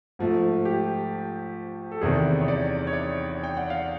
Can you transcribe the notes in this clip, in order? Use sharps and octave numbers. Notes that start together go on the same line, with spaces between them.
G#2 F3 A3
G4
A4
E2 C3 D#3 G#4
C#5
D5
C#5
D5
G5
F#5
F5